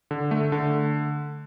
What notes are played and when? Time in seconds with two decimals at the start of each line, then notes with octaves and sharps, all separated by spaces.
0.11 D3
0.31 A3
0.52 D3